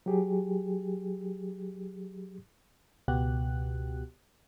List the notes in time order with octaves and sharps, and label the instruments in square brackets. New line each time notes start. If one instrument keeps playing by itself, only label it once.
[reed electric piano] F#3 G4 G#4
[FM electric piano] C#2 B2 B3 F#4 G4 F#6